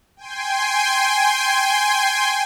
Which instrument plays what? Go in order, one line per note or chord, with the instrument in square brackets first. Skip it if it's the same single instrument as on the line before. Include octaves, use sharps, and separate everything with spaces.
[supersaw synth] G5 G#5 C6